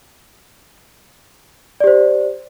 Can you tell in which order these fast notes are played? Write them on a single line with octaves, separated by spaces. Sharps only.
D5 G4 C5